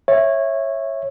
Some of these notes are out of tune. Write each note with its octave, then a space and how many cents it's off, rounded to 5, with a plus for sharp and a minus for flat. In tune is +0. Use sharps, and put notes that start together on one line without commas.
C#5 -15 E5 +0